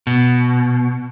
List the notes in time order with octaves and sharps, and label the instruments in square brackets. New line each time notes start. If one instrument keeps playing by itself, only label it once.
[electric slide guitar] B2